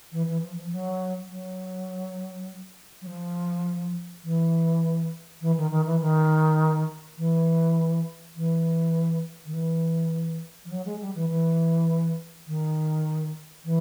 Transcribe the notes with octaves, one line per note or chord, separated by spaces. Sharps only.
E3
E3
F3
F3
F#3
F#3
F#3
F3
E3
E3
D#3
D#3
E3
D#3
E3
E3
D#3
E3
F3
F#3
G#3
G3
E3
E3
D#3
E3